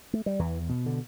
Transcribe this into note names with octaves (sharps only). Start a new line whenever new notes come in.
A3
G3
E2 E3
B2
D3